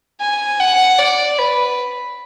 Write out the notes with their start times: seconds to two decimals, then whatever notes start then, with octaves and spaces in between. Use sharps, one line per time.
0.20 G#5
0.59 F#5
0.98 D5
1.38 B4